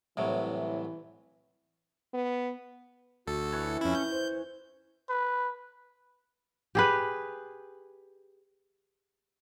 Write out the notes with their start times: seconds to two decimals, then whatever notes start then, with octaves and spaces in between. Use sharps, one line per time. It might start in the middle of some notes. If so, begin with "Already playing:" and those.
0.17 C2 A2 E3 F#3
2.14 B3
3.27 D2 F#4 A4
3.52 E3 B4 C#5
3.81 F2 C#4 E4
3.95 G6
4.11 C5
5.09 B4
6.75 G4 G#4 B4